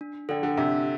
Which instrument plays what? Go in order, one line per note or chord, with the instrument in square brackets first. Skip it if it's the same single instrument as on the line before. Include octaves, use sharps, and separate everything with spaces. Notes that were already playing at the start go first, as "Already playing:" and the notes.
[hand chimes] D4
[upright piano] D3 [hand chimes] A4 D5 G5
[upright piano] D3
[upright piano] C3 [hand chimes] D4